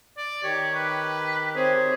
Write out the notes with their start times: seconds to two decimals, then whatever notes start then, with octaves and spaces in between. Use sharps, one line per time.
0.17 D5
0.43 D#3 G4 C#5
0.75 B4
1.56 C4 G#4 C5 C#5